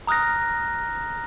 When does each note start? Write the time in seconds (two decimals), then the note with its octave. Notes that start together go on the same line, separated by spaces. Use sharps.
0.07 A#5 D#6 F6 F#6 A#6